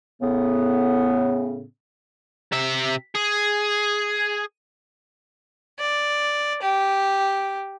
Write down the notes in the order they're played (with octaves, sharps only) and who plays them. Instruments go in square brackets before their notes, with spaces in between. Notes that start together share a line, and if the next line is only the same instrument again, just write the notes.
[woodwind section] A2 C#3 B3
[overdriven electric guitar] C3 E5
G#4
[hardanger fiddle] D5
G4